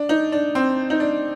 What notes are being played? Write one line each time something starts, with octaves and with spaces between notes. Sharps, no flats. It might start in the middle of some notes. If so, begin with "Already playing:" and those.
Already playing: D4
D#4
D4
C4
D#4
D4